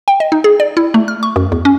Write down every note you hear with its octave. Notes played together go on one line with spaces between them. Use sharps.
G5
D#5
D#4
G#4
D5
E4
A3
F6
C#6
F#2
E2
C#4